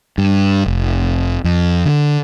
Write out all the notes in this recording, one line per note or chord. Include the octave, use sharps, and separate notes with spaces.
G2
F1
F2
D3